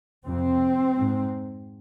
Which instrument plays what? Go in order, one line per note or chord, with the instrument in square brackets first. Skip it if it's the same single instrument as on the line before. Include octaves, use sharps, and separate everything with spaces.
[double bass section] F2 C3 C4
G#2